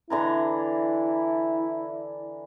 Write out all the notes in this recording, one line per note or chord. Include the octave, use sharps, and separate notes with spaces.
D3 E3 E4 A#5